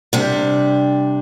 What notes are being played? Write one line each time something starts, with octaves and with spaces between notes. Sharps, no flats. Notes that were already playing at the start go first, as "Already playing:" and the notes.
C3 G3 D4